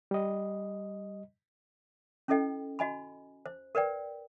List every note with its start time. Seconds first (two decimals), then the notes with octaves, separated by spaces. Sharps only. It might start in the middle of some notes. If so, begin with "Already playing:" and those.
0.11 G3 D#5
2.28 C#4 E4 A4 D#5 G5
2.79 F#4 D#5 G#5 B5
3.46 C5
3.75 A#4 B4 D5 G5